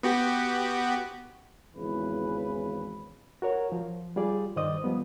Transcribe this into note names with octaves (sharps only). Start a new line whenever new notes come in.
B3 F#4 G4
G#1 E2 C#3 E3 B4
F#4 A#4 C#5
F3
G3 F4 G#4 D5
G2 D#3 C5 D5 D#5 D#6
F3 G3 B3